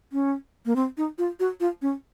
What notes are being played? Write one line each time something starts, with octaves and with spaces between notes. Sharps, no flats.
C#4
A#3
C4
D#4
F4
F#4
F4
C#4